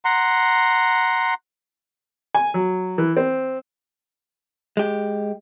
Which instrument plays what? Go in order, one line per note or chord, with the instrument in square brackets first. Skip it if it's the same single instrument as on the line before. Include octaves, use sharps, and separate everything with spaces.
[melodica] F#5 A#5 C6
[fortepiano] G#5
F#3
E3
C4
[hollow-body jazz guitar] G#3 G4